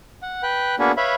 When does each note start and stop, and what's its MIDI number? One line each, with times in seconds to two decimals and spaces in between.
0.22 0.42 78
0.43 0.75 71
0.43 0.75 79
0.43 0.75 90
0.79 0.92 58
0.79 0.92 59
0.79 0.92 62
0.79 0.92 66
0.79 0.92 68
0.79 0.92 71
0.97 1.15 71
0.97 1.15 73
0.97 1.15 76
0.97 1.15 77
0.97 1.15 83